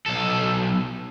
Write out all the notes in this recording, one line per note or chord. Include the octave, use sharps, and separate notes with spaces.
B1 A4